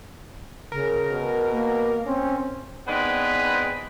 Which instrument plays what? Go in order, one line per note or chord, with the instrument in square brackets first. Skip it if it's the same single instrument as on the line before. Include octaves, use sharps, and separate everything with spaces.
[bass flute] C#3 [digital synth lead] A#4
[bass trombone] B2
[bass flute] A#3
[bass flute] C4 [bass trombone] C#4
[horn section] B3 C4 D4 D#4 G#4 B4